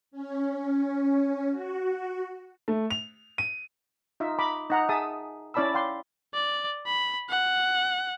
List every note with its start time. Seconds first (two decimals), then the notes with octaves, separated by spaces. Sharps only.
0.11 C#4
1.51 F#4
2.68 A3
2.91 F7
3.38 D#7
4.20 D#4 F4 E5
4.39 A#5 B5 D6
4.70 D#4 F#5 A#5
4.89 G#4 E5 A5 D#6
5.54 C#4 E4 D5 A5 B5 E6
5.74 F5 G5 C6 D6
6.34 D5
6.86 B5
7.29 F#5